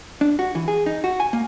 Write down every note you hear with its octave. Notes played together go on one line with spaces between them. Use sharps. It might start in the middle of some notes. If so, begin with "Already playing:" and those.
D4
F#4
E3
G#4
D#4
F#4
G#5
A#3